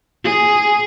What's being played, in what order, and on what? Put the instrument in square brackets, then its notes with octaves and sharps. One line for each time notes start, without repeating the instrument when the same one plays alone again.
[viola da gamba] G#4